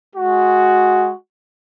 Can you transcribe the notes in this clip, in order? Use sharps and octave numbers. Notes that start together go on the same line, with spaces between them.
G#3 F#4